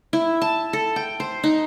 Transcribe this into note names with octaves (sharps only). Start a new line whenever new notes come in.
E4
A5
A4
G5
C5
D#4